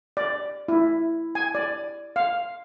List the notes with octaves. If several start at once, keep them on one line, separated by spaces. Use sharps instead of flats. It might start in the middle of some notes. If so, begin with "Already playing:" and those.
D5
E4
G#5
D5
F5